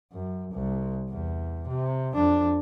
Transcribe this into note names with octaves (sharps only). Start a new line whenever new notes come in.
F#2
C2
E2
C3
F2 D4